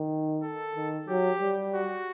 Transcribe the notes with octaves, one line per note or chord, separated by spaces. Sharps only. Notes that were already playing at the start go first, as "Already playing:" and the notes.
Already playing: D#3
A4
D#3
F#3 G4
G3
F#4